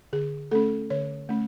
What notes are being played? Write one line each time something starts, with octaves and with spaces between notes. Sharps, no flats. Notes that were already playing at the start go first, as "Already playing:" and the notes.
D3 G#4
A3 C#4 A4
D3 C#5
A3 C#4